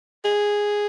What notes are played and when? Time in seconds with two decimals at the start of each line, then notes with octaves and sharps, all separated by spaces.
0.25 G#4